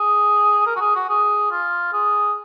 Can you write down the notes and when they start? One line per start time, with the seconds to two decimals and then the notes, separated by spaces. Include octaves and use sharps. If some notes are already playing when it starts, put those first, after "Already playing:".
Already playing: G#4
0.67 A#4
0.76 F#4
0.81 G#4
0.95 F#4
1.10 G#4
1.51 F4
1.93 G#4